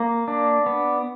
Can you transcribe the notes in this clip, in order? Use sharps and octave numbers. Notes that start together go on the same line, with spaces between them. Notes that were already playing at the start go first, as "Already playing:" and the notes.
Already playing: A#3
D4
B3